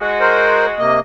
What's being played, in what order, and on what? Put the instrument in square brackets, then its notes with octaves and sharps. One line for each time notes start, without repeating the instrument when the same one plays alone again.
[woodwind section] G#3 F#4
[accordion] A#4 C5
C3 A#3 D#5